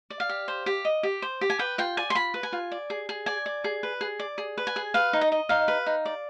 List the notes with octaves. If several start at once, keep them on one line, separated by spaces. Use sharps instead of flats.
D5
F5
G4
C5
G4
D#5
G4
C5
G4
G#5
B4 G5
F4 G5
D5 G#5
C6
F4 B5
B4
G#5
F4
D5
G#4
G#4
D5 G#5
D5
G#4
B4
G#4
D5
G#4
B4
G#5
G#4
B4 F5
D#4
D#5
D#5
D#4 F5
B4
D#4
D5